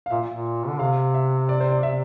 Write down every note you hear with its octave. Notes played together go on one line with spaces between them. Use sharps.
F5
A#2 E5
A#2
D3
C3 F5
E5
D5
C5
D5
C3 E5